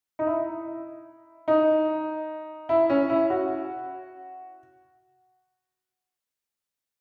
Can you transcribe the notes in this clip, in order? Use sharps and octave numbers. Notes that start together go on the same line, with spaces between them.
D#4
E4
D#4
E4
C#4
E4
F#4